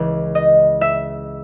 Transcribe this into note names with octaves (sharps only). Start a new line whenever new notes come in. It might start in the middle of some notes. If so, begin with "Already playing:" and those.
Already playing: C#2 C#3 E3
D#5
E5